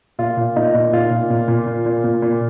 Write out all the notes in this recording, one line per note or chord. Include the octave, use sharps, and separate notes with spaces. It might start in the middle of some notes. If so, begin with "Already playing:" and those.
A#2 F4
A#2
A#2 D#4
A#2
A#2 F4
A#2
A#2
A#2
A#2
A#2
A#2
A#2